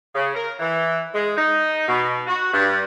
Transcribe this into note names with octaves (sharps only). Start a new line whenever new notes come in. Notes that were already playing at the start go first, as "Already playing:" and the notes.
C#3
A#4
E3
G#3
D#4
B2
F#4
G2